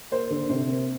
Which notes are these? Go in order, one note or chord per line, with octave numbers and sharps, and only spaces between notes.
A#3 C5
D3
C3 C5
A#3